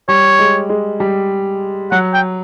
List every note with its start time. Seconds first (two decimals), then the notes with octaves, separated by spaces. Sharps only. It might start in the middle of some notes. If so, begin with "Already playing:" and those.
0.08 G3 C#5
0.39 G#3
0.69 G#3
1.00 G3
1.91 F#3 F#5
2.14 G5